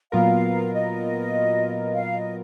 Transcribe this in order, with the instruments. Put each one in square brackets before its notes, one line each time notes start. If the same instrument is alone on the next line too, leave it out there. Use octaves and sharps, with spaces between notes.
[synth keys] A#2 F#3 B3 F4 A#4 [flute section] F5
[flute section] D#5
F5
D#5